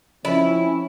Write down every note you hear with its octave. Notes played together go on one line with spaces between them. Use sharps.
F3 C4 C#4 E4